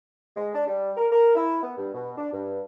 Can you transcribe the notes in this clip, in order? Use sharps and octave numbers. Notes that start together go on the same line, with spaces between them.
G#3
D4
G3
A#4
A#4
E4
B3
G2
B2
D4
G2